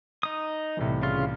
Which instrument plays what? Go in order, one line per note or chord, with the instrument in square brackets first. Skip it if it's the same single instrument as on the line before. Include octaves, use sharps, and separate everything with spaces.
[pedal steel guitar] D#4 D#6
[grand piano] C2 A2 E3
[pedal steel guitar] C#3 F4